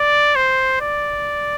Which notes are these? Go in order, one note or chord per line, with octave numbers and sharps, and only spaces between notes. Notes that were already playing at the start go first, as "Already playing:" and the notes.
Already playing: D5
C5
D5